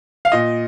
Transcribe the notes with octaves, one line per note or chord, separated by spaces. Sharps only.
F5
A#2 D#5